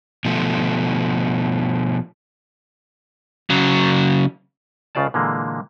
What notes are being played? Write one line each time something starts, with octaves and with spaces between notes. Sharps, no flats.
B2 F3 A3
C#3 F#3
C#2 C#3 F4 D5 A5
A#2 D3 E3 G#3 A#3